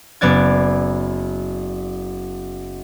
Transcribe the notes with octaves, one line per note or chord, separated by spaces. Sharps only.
F#1 B3 D5 G#6